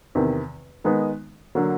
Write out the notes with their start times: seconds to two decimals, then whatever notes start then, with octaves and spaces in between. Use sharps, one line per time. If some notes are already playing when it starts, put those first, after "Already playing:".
0.15 E2 C3 D#3
0.84 D#3 G#3 B3 D#4
1.55 D3 F#3 A#3